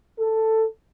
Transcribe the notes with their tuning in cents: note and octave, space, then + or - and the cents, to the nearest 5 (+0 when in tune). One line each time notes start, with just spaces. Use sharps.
A4 +10